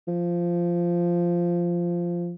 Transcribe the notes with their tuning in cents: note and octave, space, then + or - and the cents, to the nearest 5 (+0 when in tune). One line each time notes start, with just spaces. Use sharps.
F3 -10